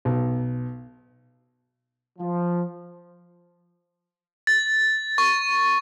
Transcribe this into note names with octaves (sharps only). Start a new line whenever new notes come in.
B1
F3
A6
C#6